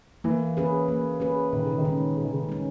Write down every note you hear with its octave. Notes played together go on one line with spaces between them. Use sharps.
E3 A#3
C#4 G#4 B4
A#3
C#4 G#4 B4
A#2 D#3
C#3
D#3
G#3 C#4
A#2 C#3
D#3
C#3
G#3 C#4